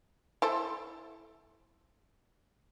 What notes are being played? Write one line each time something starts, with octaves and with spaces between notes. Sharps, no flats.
E4 A4 C5